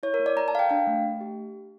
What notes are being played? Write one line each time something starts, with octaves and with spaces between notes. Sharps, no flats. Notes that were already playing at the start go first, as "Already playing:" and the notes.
E4 C#5
A#4
A#3
D5
A#3 A#5
A5
A4 F5
G5
D4 F5
A3
A3
G4